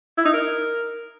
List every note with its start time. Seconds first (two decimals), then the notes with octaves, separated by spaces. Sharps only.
0.18 E4
0.25 D#4
0.33 A#4